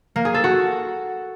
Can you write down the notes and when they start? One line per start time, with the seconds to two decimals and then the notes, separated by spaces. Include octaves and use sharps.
0.16 A#3
0.25 G#4
0.34 A4
0.44 F#4